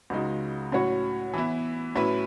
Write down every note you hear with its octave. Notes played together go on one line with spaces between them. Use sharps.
C#2 C#3 G#3 D#4 F#4
A2 F#3 C#4 F#4 C#5
E3 B3 E4
A2 F#3 C#4 E4 B4